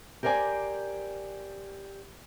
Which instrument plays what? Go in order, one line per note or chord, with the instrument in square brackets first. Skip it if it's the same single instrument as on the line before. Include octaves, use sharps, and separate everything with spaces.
[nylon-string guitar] G4 A#4 C5 D5 G#5